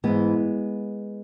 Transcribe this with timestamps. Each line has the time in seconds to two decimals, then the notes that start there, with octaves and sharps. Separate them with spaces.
0.04 G#2 E3 G#3 B3